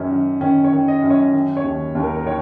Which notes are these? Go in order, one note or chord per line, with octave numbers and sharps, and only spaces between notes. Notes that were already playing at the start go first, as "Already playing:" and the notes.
Already playing: F#2 D#3 C#4
F#2
D#3 C#4
C#5
D#3
D#5
F#2
C#5
D#3
C#5
D#2
D#2
A#4
A#4
D#3 C#5